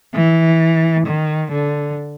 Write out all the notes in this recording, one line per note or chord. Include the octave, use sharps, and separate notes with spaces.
E3
D#3
D3